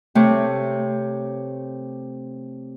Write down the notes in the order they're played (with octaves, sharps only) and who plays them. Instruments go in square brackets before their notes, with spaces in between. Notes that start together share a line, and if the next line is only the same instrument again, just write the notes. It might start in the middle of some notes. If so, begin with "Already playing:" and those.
[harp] C3 A3 C4 C#5